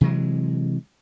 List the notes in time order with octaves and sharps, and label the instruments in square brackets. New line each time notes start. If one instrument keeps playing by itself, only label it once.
[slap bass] C3 E3 F#3 G#3